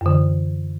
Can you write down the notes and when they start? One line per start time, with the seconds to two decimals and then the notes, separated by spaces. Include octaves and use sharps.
0.01 F#2
0.06 D3
0.11 E3